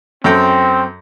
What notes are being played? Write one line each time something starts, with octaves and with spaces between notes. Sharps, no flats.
F#2 C4 A4 G5